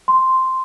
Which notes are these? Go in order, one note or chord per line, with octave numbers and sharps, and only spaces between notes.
C6